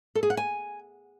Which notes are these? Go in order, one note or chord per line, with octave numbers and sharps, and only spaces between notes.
A4
G#4
F#5
G#5